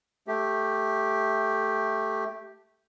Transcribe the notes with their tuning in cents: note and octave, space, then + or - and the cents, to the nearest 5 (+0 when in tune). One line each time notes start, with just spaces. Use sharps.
A3 +0 G4 +0